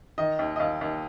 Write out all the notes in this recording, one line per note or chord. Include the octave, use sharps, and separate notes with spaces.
D#3 D#5
D#2
D#5
D#2 F5
D#2